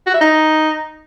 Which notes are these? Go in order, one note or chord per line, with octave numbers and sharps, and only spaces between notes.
F#4
E5
D#4